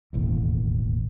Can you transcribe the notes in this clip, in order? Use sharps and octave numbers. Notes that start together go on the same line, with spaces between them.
E1 A1 D#2